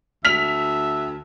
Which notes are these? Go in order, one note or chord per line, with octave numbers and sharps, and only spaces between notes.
D2 E5 F6 B6 F7